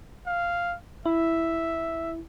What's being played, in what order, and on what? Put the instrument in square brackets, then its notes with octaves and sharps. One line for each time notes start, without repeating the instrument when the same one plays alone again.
[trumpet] F5
[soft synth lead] E4 [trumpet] E5